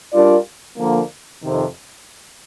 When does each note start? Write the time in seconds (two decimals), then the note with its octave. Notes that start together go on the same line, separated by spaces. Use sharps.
0.13 G3 D4 F4 A#4 D5
0.78 D3 F3 A#3
1.42 F2 C3 D#3